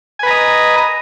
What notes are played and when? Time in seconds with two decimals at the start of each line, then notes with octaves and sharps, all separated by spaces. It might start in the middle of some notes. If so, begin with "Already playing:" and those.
0.19 G#5
0.23 B4
0.27 A#5
0.30 D#5